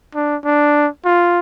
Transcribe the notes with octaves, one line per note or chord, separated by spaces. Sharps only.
D4
D4
F4